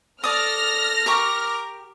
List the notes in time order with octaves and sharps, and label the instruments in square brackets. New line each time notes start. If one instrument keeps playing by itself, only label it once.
[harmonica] A4 [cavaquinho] D5 D#6 [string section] F6 A#6
[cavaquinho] G4 A#5 C#6 [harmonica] A#4 D6